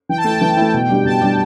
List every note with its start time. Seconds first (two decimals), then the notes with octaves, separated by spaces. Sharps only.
0.09 E3 G5
0.18 A5
0.24 A3 E4 G5
0.41 E3 G5
0.57 A3 E4
0.74 B2
0.89 G3 D4 G4
1.05 B2 A5
1.21 G3 D4 G4